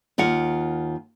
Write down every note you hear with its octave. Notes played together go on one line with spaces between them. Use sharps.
D#2 F4 A#4 F#5